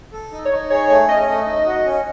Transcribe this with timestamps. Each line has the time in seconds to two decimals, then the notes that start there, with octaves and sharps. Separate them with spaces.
0.13 A4
0.32 D#4
0.45 C#5
0.52 D#4
0.70 G#4 C#5
0.90 A3
1.09 C#4 D#5
1.28 A3
1.46 D#4
1.66 F#4
1.85 C#4